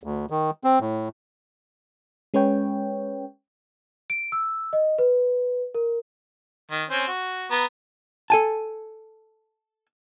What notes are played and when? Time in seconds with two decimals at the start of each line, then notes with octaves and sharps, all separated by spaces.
0.04 D2
0.30 D#3
0.64 C4
0.81 A2
2.34 G#3 C#4 B4 C#5 G5
4.10 D7
4.32 E6
4.73 D#5
4.99 B4
5.75 A#4
6.71 D#3
6.90 C4 C#4 C5
7.08 F#4
7.51 B3 A#5
8.30 A4 G#5 A5